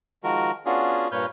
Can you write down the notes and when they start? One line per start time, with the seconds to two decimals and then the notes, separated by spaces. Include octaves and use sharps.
0.24 D#3 F3 G#3 F#4 A#4
0.66 B3 C#4 D4 F4 F#4 G#4
1.12 G2 A#2 B4 C#5 F6 G6